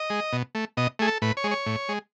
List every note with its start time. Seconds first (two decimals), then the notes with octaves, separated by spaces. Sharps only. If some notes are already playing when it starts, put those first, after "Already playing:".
Already playing: D#5
0.10 G#3
0.33 B2
0.55 A3
0.77 B2 D#5
0.99 A3 G#4
1.07 A4
1.22 A2 B4
1.37 C#5
1.44 G#3
1.51 C#5
1.66 A2
1.89 G#3